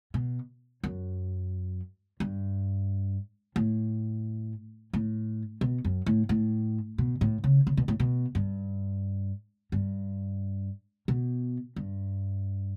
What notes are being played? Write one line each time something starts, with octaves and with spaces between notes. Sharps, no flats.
B2
F#2
G2
A2
A2
B2
F#2
A2
A2
B2
A2
C#3
C#3
B2
A2
B2
G2
G2
B2
G2